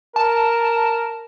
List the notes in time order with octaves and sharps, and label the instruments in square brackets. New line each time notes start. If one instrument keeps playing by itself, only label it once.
[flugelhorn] A#4 [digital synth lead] A5